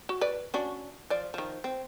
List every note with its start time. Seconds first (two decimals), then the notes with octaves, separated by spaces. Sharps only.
0.09 F#4
0.21 B4 D5
0.54 C#4 D4 F#4
1.10 F3 D5
1.34 D#3 F3
1.64 C4